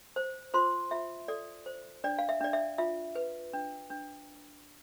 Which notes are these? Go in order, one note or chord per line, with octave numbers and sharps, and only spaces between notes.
C5
F4 C5 C6
F4 E5
A4 D5
C5
D4 D5
F5
E5
D4 D5
E5
F4 E5
B4
D4
D4